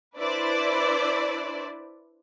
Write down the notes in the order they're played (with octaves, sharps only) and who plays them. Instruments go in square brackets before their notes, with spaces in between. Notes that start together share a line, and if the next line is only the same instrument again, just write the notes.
[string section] D4 E4 B4 C5 D5